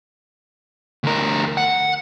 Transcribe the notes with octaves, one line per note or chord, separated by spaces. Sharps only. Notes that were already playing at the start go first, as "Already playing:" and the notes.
D2 A#4
F#5